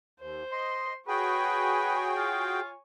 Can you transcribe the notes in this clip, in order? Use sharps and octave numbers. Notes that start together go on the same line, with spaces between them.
D#2 C5
D#5 C6
F#4 G#4 B4 C#5 G5 G#5
F4